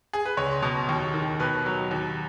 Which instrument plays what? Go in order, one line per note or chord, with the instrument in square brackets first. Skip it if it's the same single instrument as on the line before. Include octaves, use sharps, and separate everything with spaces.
[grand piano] G#4
B4
C#2 C#5
B2
D#2
D#3
B2 B4
F#3
D#2